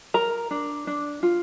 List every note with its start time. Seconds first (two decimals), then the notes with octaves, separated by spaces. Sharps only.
0.14 A#4 A#5
0.51 D4
0.87 D4
1.23 F4